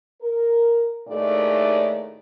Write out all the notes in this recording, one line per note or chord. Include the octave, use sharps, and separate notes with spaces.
A#4
D#2 A2 A3 D#4 G#4 D5